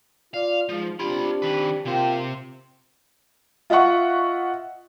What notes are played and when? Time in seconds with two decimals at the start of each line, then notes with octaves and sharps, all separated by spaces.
0.34 F4 D5 F5
0.69 G#2 F3
0.99 C4 D4 F4 G4 B5
1.42 D#3 B4
1.85 C3 A#3 F4 C5 G5
3.70 F4 D#5 E5 F#5 C#6